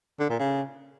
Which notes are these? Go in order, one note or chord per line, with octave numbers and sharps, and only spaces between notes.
D3
A#2
C#3